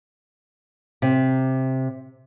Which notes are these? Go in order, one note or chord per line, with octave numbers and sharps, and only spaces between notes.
C3